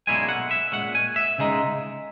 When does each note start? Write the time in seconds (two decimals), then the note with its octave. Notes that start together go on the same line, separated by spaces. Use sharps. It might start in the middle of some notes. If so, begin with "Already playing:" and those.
0.07 B1 A#2 G#3 C#4 E4 G#5
0.29 F#5
0.51 E5
0.72 A#2 G#3 C#4 F#5
0.95 G#5
1.16 E5
1.38 C#3 G#3 D#4